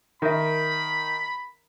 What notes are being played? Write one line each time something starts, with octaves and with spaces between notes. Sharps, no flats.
D#3 A#4 E5 B5